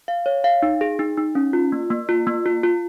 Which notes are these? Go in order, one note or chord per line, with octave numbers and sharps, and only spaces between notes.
F5
C#5
F5
D#4
G#4
D#4
D#4
C#4
F4
A#3
A#3
F4
A#3
F4
F4